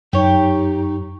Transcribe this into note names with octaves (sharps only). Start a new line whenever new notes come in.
F#2 D#4 G4 C#5